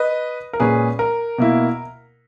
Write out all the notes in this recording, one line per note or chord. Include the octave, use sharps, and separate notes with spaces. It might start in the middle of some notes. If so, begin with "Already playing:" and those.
Already playing: B4 D#5
A#4
A#2 G#3 C#4 G#4 B4
A#4
B2 A#3 E4